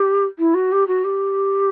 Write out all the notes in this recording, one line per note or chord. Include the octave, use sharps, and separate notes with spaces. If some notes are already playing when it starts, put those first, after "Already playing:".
Already playing: G4
E4
F#4
G4
F#4
G4